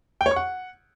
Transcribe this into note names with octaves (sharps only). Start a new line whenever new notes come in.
G5
C#5
C#6
F#5